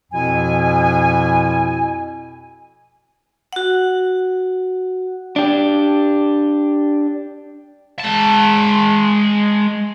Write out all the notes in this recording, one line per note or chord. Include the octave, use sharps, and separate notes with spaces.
F2 B2 F3 E4 G#5
F#4 F#5
D4 G4
G#3 A5